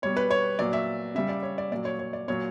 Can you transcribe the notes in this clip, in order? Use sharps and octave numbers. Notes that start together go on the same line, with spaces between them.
B2 G3 C#5
B4
C#5
A#2 F#3 D5
E5
C#3 G3 E5
D5
C#5
D5
A#2 F#3 D5
C#5
C#5
D5
A#2 F#3 C#5